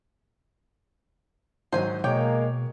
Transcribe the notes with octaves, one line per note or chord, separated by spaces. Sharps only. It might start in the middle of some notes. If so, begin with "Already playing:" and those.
G#2 D#3 F#3 C5 G#5
B2 G#3 A#3 C#5 G5 D6